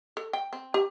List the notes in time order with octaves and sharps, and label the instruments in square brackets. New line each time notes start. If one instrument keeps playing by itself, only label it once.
[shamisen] A4
G5
C4
G4